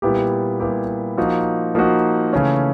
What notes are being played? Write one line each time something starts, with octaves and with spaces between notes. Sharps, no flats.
A#2 G3 B3 E4 G4
A#2 G3 B3 E4 G4
F3 A#3 D#4 F#4
F3 A#3 D#4 F#4
C#3 E3 A3 C#4